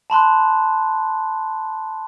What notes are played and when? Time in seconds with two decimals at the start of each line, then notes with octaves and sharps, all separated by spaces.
0.10 A5 B5 C6 F#6